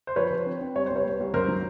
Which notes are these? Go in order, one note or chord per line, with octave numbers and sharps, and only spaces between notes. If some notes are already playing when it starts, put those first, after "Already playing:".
C5
F3 B4 C#5
F3
C4
C4
G3 C#5
C2 C5
B4 C#5
C2
C2
F#2 A#4 C5
F#3